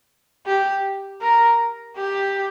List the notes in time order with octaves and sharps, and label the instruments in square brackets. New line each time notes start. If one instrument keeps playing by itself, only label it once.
[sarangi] G4
A#4
G4